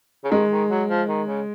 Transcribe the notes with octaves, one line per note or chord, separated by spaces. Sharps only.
C#3
D#3 G#3
D#3
F#3
F3
D#3
C#3